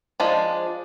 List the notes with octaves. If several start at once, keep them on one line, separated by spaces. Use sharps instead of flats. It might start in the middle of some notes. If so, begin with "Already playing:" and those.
F3 G#3 D4